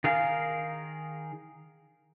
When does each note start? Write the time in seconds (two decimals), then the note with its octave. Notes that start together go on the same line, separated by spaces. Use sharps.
0.04 D#3 G#4 A#4 F5